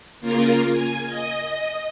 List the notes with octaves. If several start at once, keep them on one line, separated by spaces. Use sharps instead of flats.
C#3 A#3 F4 A#4
G#5
D#5